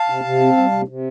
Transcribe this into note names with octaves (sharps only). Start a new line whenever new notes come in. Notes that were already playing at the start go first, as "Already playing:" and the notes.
Already playing: F5 A5
C3
C3
C4
G3
C3
C3